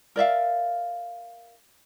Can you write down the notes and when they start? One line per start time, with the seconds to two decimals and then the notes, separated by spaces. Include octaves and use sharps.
0.16 A#4 D5 E5 F5